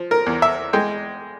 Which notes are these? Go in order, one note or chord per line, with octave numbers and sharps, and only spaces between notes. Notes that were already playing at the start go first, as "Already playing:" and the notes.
Already playing: F3
A#4
E2
E5
G#3 G5